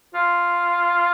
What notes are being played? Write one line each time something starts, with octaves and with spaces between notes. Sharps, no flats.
F4